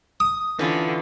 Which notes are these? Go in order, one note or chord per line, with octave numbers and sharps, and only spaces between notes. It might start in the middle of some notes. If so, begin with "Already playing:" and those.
D#6
D3 E3 C#4 F4